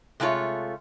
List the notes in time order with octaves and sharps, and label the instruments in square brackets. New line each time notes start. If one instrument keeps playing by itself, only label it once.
[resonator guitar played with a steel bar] C3 G#3 A3 F4 C#5